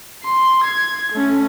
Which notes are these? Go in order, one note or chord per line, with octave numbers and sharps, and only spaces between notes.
C6
G#6
A3 C#4